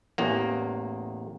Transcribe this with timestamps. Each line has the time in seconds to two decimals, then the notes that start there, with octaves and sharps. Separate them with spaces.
0.18 A1 E2 A#3